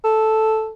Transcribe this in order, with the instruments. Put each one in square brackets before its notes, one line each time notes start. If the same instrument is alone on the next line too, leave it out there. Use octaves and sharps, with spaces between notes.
[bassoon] A4